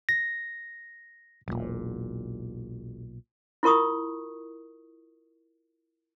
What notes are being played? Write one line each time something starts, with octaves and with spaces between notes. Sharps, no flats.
A#6
E1 B1 A#2
E4 F4 A#4 C#6 D#6